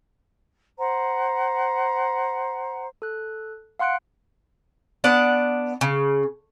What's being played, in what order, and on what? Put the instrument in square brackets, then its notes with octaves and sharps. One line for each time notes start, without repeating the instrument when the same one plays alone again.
[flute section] C5 F#5 A#5
[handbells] A4 F#6
F5 F#5 C6 F#6 C#7 D7
[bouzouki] B3 D4 D5 F#5
C#3